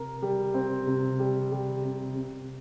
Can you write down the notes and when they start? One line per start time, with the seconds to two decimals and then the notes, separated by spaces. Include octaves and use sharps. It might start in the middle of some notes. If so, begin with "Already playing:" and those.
Already playing: C3 A#4
0.22 G3
0.54 C4
0.87 C3
1.19 G3
1.52 G3
1.84 C3
2.16 C3